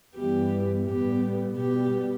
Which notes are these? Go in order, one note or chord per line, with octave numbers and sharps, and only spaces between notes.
G2 E3 G3 B3 G4
A2 G3 B3 G4
B2 G3 B3 G4